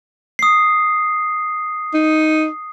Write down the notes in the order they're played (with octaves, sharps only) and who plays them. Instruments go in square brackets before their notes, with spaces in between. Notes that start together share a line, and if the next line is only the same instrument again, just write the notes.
[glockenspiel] D#6 C7
[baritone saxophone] D#4